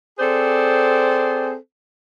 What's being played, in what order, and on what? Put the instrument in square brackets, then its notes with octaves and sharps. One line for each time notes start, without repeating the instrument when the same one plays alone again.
[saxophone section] C4 G#4 A4 C5 D5